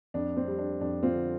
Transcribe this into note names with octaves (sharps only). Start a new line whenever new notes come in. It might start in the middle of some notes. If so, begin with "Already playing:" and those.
F2 D4
C4
G3
D4
F2 D4
C4 F4
D3